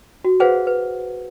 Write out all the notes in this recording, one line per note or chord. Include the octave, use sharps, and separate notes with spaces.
F#4
G#4 B4 C5 F5 F#5
B4